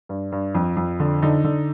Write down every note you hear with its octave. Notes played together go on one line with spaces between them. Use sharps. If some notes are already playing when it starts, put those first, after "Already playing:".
G2
G2
F2
F2
D3
D3 D#4
D3